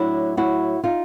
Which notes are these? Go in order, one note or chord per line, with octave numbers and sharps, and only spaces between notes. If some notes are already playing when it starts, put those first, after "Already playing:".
Already playing: A2 F#3 D4 E4
E4 F#4
D#4 F4